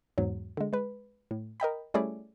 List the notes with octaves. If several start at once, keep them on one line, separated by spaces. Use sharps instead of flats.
E2 G#2 F#3
D3 G#3
G#3 B4
A2
A#4 D#5 G5 B5
G3 A3 C#4 E4 G#4 D5